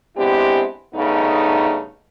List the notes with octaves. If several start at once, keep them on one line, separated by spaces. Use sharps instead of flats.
G#3 B3 C4 D4 E4 G4
G2 C#3 A3 B3 D#4